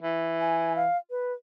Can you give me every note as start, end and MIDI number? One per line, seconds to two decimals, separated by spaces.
0.02 0.87 52
0.40 0.73 80
0.76 0.97 77
1.10 1.33 71